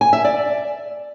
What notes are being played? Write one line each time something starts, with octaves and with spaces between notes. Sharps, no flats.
G#5
E5
D5